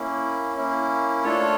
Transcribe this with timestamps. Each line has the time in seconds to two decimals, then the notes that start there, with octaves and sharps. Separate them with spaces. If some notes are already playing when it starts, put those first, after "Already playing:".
Already playing: A#3 C#4 E4
0.56 A#3 C#4 E4
1.24 A3 D4 F4 A4 C#5